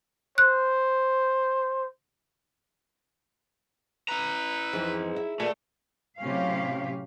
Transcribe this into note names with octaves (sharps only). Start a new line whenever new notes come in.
C5 F#6
E4 B4 A#5
F2 G#2 E3 G#3
E5
A#2 A3
A2 C3 F#3 C#4 G4 F5